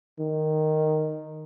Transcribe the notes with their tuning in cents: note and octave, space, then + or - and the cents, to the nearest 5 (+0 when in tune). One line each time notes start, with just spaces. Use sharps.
D#3 -5